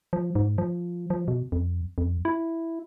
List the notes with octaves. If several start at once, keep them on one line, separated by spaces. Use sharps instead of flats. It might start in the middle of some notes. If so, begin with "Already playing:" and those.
F3
G#2
F3
F3
B2
F2
F2
E4